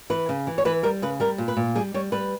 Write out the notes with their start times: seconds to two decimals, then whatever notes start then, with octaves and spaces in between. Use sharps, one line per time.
0.10 E3 B4
0.29 C#3
0.47 E3
0.58 C#5
0.65 E3 B4
0.83 G3 A#4
1.02 C#3 B4
1.20 G3 A#4
1.38 A#2
1.48 B4
1.57 A#2
1.76 G3 G#4
1.94 G3 C#5
2.12 G3 B4